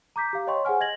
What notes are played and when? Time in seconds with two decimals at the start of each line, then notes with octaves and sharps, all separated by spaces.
0.16 A#5 D6 G6 B6
0.33 G4 F5
0.47 C#5 D#5 G5 C6 C#6
0.65 G#4 C5 F#5 G#5 F6
0.80 D#5 G#6 A#6 F#7